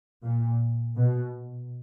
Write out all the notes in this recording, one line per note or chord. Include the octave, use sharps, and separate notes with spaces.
A#2
B2